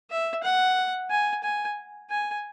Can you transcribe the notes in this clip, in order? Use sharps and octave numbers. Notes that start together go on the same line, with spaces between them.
E5
F#5
G#5
G#5
G#5